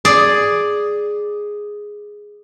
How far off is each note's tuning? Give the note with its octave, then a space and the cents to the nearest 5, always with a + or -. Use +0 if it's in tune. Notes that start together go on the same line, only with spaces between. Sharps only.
G#4 +0 D5 +0